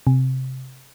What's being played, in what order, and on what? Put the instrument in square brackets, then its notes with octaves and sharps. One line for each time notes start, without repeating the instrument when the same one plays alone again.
[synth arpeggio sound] C3